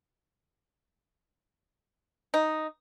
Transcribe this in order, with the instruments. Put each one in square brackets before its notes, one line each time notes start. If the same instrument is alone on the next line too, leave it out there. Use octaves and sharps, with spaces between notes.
[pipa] D#4